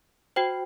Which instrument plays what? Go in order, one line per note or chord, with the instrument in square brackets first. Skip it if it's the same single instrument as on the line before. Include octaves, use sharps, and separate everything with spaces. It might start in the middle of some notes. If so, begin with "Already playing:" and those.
[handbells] F#4 C5 G5